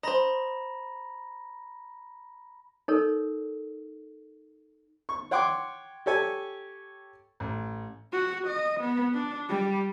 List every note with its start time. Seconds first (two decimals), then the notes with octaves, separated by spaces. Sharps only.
0.03 C5 D#5 A#5 B5 A#6
2.88 D#4 A4 A#4 C#5
5.09 C#6
5.31 C#5 F#5 G5 C6 D6
6.06 G4 A4 C#5 G#5
7.40 A1
8.13 F#4
8.47 D#5
8.80 B3
9.14 D4
9.49 G3